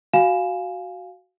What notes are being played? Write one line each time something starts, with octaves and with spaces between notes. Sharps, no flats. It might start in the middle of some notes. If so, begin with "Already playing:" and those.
F#4 F5 G#5 E7